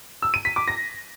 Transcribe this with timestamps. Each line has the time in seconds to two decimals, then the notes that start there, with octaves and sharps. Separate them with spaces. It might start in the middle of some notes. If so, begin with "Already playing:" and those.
0.22 E6
0.34 D#7
0.45 B6
0.56 D6
0.68 A#6